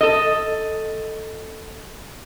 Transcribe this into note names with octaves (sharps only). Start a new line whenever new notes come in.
A4 D#5